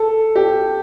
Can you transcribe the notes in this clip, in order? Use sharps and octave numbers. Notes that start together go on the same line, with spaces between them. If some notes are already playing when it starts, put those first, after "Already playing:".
Already playing: A4
G4